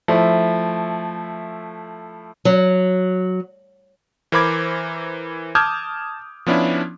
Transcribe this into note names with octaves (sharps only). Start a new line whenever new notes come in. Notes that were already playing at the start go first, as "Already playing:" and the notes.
F3 A3 E4
F#3
E3 A#4 C5 B5 D6 G#6
A5 D6 D#6 F6 G6 G#6
F3 B3 C#4 D4 E4